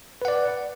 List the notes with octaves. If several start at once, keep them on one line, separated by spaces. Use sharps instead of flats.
B4 D5 F#5